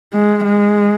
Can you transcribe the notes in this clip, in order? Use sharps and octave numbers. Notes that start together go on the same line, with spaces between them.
G#3
G#3